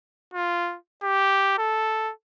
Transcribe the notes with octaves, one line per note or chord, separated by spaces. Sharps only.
F4
G4
A4